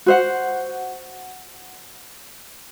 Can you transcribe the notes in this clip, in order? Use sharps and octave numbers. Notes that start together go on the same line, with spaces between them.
F#4 C5 F#5